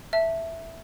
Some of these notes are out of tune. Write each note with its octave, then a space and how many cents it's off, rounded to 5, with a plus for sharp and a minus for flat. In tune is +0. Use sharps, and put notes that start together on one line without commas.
E5 +0 A5 +0